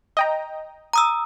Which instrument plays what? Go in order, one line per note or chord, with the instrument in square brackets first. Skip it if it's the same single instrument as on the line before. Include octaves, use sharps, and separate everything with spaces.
[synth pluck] D#5 G5 A#5
[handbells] A#5 D#6 E6